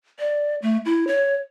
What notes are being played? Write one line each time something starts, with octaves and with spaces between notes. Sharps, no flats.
D5
A3
E4
C#5